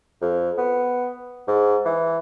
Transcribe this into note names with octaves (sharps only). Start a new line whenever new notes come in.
F2
B3
G#2
E3